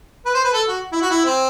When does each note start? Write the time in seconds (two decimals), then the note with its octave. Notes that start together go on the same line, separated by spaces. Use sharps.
0.25 B4
0.34 C5
0.44 B4
0.53 A4
0.68 F#4
0.92 E4
1.01 F#4
1.10 E4
1.25 C4